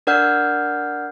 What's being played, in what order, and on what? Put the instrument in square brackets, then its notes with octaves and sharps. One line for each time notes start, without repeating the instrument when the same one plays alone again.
[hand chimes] D4 A#4 D5 F#5 F6 G6